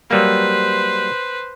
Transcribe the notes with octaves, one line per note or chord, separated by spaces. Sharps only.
F#3 G3 A#3 B4 C5